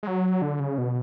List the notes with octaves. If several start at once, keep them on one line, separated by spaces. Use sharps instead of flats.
G#3
F#3
D3
C#3
B2